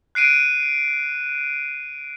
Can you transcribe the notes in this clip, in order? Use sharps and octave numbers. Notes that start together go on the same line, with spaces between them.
F#6 C7 D7 D#7